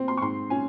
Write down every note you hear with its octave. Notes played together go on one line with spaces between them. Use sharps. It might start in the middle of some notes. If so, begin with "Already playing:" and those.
Already playing: C4
C6
C#6
G#2 C6
C#4 G#5